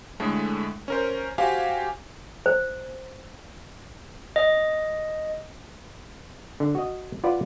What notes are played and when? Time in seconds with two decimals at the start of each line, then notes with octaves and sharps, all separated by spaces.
0.20 A2 D3 G#3 A3
0.88 C#4 A#4 C5
1.38 F#4 G4 C5 F5 G#5
2.46 C5
4.36 D#5
6.60 D3
6.75 F#4 D#5
7.24 F4 B4 D5 F#5